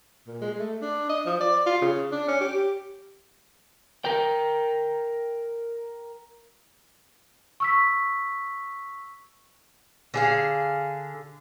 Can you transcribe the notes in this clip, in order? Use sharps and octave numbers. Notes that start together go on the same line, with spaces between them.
A#2
G#3
A3
D4
D#5
F3
D5
F4
C#3
D4
C#4
G4
A#4 G5
C#6 E6 B6
D3 G#4 F5